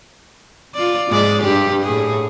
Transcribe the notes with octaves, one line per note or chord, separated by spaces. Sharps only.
F4 D5
G#2 G#3 D5
G2 G4
A2 G#4